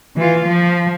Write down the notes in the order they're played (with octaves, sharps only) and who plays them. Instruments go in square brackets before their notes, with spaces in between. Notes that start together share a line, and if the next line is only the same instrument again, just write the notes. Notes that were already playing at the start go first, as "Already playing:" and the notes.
[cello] E3 F4
F3